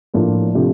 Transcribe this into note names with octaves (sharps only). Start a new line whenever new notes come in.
A2 F3 A#3 D4
C3 F3 A3 D4 G4